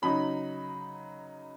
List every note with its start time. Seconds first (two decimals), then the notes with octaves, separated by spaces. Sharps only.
0.02 C#3 F#3 D#4 B5